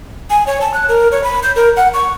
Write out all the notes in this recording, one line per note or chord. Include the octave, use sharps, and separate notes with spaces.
G#5
C#5
A5
F#6
A#4
C#5
B5
G6
A#4
F#5
C#6